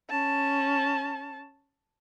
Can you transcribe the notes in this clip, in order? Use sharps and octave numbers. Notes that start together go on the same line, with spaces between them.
C#4 A5